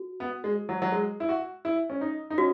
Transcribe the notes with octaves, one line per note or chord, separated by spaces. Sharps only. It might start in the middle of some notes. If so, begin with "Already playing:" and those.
Already playing: F#4
B3
G#3
F#3
F#3
G#3
E4
F#4
E4
C#4
D#4
D#4
C#4 F#4